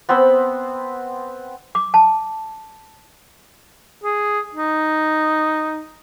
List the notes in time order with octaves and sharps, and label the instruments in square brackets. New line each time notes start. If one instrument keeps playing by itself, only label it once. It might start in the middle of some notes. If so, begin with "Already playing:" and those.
[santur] B3 C4 C5 B5
[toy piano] D6
A5
[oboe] G#4
D#4